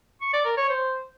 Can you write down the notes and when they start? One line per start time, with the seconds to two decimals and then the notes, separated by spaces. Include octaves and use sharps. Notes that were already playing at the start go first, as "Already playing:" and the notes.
0.21 C#6
0.33 D5
0.45 A#4
0.57 C#5
0.69 C5